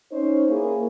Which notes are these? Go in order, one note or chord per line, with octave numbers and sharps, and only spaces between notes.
C#4 D#4 C5 C#5
A#3 E4 G#4